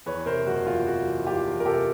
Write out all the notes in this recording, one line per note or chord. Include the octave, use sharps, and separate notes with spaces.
E2 B4 C#5
C3 A#4 C5
F#1 F#4
E2 F4
C3 F#4
E3
E2 F4 G4
E2
A#4
C3 G4 A4